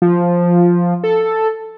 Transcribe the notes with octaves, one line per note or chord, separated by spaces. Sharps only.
F3
A4